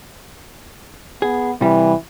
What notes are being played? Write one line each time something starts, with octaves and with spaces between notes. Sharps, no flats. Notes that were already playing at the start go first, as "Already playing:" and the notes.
B3 G#4
C3 E3 G3